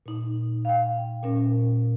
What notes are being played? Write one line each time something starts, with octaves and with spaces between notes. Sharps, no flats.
A#2 D#4
F5 G5
A#2 C#4 A#4